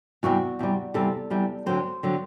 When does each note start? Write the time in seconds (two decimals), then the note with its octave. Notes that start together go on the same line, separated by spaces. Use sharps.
0.23 E2 C3 G3 F#4
0.59 E2 C3 G3
0.94 E2 C3 G3 A4
1.30 E2 C3 G3
1.66 D2 D3 F#3 C4 C5
2.03 D3 F#3 C4